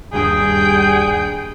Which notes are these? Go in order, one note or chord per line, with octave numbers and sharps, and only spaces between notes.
D#1 G2 G3 G#4 G5 D#6